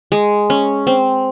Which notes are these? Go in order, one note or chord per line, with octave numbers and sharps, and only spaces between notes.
G#3
C#4
C4